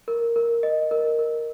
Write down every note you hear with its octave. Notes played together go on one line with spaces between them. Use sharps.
A#4
A#4
D#5
A#4
A#4